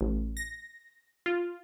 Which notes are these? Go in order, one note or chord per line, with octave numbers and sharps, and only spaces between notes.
A1
A#6
F4